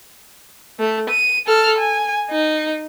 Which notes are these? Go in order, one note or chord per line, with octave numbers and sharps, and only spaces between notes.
A3
D#7
A4 F6
G#5
D#4